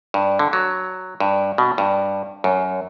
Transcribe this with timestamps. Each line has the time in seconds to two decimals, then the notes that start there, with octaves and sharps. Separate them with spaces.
0.14 G2
0.39 D3
0.53 F#3
1.20 G2
1.58 B2
1.78 G2
2.44 F#2